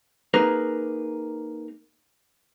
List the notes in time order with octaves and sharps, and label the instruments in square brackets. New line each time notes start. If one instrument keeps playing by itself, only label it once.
[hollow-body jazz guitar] A#3 D#4 G#4 A#4 B4